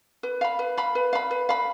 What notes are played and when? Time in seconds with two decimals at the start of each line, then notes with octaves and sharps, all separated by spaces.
0.23 B4
0.41 F5 B5
0.59 B4
0.77 F5 B5
0.95 B4
1.13 F5 B5
1.31 B4
1.49 F5 B5